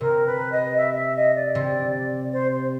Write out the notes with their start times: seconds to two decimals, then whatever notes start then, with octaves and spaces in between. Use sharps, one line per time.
0.01 C3 A#4
0.27 B4
0.52 D#5
0.77 E5
0.92 D#5
0.96 E5
1.16 D#5
1.35 D5
1.55 C3
2.33 C5
2.52 C5